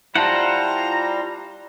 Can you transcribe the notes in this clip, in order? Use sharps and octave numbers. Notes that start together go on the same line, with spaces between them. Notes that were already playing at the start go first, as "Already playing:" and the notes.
G3 E4 F4 C5 F#5 A5 A#5